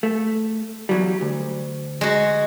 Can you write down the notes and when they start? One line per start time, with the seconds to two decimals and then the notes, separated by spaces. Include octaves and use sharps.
0.03 A3
0.89 E2 F#3 G3
1.21 D2
2.01 G#3 F#4